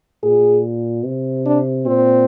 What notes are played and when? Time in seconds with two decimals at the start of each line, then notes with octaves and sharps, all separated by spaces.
0.23 A#2 G#4
1.05 C3
1.46 D4
1.86 A#2 C4